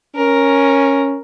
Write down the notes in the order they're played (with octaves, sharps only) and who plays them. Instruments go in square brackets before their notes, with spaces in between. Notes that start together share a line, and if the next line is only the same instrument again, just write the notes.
[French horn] C#4 [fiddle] A#4